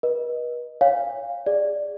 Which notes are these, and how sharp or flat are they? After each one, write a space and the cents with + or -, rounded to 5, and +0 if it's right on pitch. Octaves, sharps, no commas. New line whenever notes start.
B4 -40 D#5 -5
C#5 +5 F5 +0 G#5 -35
G#4 -15 D5 +10